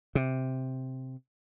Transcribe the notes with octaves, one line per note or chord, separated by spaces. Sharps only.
C3